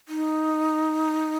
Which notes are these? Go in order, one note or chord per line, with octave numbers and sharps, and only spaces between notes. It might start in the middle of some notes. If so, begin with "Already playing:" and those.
D#4